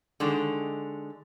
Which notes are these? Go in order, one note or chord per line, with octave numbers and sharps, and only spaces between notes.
D3 D#3 G#3